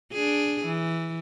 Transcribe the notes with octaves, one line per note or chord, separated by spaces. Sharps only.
D4 G#4
E3